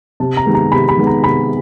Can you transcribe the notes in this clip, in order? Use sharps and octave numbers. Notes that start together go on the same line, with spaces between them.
C3 A5
A#5
D#3 G#3 B3
A#5
C3 B5
B5
D#3 G#3 B3
A#5
C3 B5